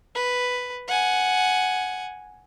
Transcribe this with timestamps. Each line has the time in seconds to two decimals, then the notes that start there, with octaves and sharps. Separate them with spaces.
0.15 B4
0.88 F#5 G#5